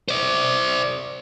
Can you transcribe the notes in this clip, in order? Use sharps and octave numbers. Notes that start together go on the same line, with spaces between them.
C5 D5